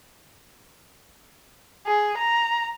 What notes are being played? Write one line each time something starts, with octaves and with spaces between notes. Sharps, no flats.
G#4
A#5